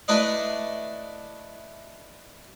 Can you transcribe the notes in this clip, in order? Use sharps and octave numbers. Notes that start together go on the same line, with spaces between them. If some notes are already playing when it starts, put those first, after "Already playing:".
A3 D4 E4 B4 D#5